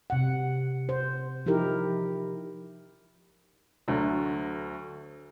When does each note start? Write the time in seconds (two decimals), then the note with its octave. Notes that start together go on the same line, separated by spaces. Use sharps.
0.10 C3 F#5
0.89 C5
1.46 F3 D#4 E4 G4 A#4
3.88 D2 D3 F#3 A3